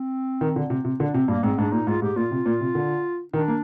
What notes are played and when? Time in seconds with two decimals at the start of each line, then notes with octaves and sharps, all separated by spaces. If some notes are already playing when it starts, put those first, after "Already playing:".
Already playing: C4
0.41 D#3
0.56 D3
0.70 C3
0.85 C3
1.00 D3 D4
1.14 C3 C4
1.28 G2 A#3
1.43 G#2 C4
1.58 G#2 D4
1.72 A#2 D#4
1.87 G#2 F4
2.02 G#2 G4
2.16 A#2 F4
2.31 C3
2.46 A#2
2.61 C3
2.75 D3
3.34 D#3 D4
3.48 A#3